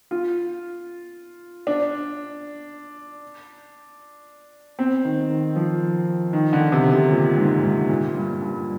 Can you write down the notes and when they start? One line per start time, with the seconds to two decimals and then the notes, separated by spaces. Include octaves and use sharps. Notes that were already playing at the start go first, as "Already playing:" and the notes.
0.11 F4
1.67 D4
4.79 C4
5.05 D#3
5.30 D#3
5.56 F3
6.33 D#3
6.53 D3
6.72 C3
6.92 C3
7.11 A#2
7.37 G#2
7.64 G#2
7.89 A#2
8.15 G2
8.41 G2